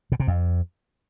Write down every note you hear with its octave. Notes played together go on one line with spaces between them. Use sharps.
B2
C3
F2